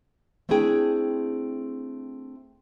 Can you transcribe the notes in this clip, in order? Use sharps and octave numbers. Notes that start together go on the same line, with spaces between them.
A3 C4 D4 E4 G#4 G5